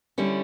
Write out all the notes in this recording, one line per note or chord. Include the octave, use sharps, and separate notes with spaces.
D3 G3 C#4 E4